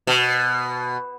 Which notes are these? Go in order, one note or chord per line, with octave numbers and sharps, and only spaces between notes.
B2